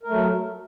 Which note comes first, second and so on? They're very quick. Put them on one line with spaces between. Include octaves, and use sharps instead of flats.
A#4 A3 F#3